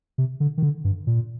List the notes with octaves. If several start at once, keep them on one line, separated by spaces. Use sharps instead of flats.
C3
D3
D#3
D3
G2
A#2